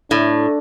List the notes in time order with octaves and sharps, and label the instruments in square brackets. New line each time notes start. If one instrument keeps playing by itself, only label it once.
[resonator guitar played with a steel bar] A2 [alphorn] D4